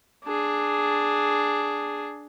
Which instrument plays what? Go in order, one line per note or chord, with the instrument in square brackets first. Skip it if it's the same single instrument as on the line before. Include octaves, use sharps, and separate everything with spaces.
[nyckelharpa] D4 G#4